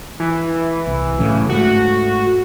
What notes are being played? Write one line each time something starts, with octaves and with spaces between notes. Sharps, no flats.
E3
C2
A2 C#3 F#3
G#2 A3 F#4